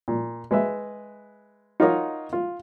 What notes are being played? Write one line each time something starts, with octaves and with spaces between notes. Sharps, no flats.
A#2
G#3 B4 E5
D#4 F4 F#4 A#4 C#5 D#5
F4